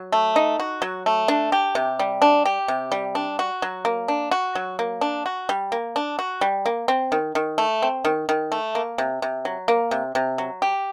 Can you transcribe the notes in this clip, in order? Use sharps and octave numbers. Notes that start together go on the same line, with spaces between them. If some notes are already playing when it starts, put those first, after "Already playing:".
Already playing: F#3
A3
D#4
F#4
F#3
A3
D4
G4
C3
G3
D4
G4
C3
G3
D4
F#4
F#3
A#3
D4
F#4
F#3
A#3
D4
F#4
G3
A#3
D4
F#4
G3
A#3
C4
D#3
D#3
A3
C4
D#3
D#3
A3
A#3
C3
C3
F#3
A#3
C3
C3
F#3
G4